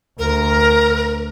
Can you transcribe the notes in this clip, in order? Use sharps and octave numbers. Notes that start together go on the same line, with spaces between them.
D2 A#4